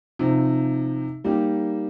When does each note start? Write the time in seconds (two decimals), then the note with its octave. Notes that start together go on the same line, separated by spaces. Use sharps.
0.19 C3 F3 C4 D#4
1.24 G3 A#3 D#4 G4